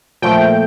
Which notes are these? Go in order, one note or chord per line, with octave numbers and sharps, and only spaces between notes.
A#2 F3 A3 G5